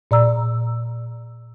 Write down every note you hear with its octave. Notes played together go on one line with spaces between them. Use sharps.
A#2 D5 A#5 E6